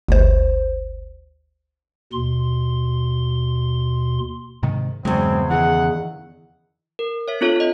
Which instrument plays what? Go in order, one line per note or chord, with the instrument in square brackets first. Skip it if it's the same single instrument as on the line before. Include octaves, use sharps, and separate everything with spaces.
[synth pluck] G1 D2 C5
[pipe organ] D#2 B2 C6
[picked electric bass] G#2 C3 D#3
[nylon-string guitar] E2 C#3 [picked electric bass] G2 F#3 G#3 [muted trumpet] C4
[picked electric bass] D#3 E3 [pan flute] G#4 [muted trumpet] F#5
[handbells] A#4
C#5 E5 B6
C4 D4 F4 A4 C#5
A4 D#5